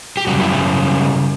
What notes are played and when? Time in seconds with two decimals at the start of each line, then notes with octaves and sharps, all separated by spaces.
0.17 G4
0.27 F#2 C#3 G3 F#4
0.41 E4
0.53 E4